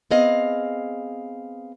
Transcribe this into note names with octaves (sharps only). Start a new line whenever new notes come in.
B3 C4 G#4 D#5 F5